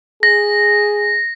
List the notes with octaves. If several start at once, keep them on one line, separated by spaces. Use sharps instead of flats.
G#4 A#6